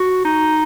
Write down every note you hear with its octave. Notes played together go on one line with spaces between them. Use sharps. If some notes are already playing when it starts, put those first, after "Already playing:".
Already playing: F#4
D#4